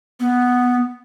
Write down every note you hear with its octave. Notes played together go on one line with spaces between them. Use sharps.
B3